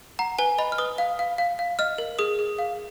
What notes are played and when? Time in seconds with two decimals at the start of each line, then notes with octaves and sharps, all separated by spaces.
0.19 F#5 A#5
0.39 B4 G#5
0.58 D#5 B5
0.72 F6
0.78 B4 D#6
0.98 F5
1.19 F5
1.38 F5
1.59 F5
1.79 D#5 F6
1.98 A#4
2.19 G#4 D#6
2.39 G#4
2.59 F5